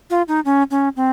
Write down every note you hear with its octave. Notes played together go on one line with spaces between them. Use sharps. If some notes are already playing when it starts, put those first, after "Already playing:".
F4
D#4
C#4
C#4
C4